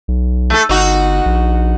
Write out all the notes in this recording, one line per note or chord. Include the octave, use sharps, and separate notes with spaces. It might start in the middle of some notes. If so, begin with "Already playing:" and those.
B1
A3 A4
G1 D#4 F#4
A#1